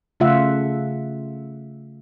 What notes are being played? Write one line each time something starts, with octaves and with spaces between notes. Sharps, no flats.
C#3 A3 F4 E5 F#5